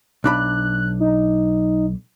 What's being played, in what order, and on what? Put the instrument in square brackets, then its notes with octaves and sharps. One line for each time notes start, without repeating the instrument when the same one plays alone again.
[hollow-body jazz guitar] B1 D4 B5 [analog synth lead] F#6
[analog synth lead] D#4